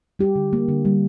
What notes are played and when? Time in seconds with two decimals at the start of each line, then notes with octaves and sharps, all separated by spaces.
0.19 G3 G4
0.36 D3
0.53 A#3
0.68 D3
0.85 G3